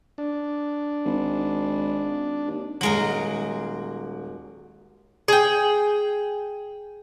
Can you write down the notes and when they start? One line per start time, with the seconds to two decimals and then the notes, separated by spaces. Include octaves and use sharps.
0.18 D4
1.05 G#1
2.47 D#2
2.81 D#1 F#3 G#3 A#4 D7 F#7
5.28 G#4 G5